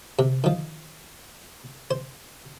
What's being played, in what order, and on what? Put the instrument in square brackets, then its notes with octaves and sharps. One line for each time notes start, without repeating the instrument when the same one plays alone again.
[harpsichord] C3
D#3 F3
C5